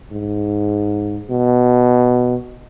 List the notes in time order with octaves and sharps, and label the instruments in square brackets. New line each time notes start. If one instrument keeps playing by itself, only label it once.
[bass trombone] G#2
B2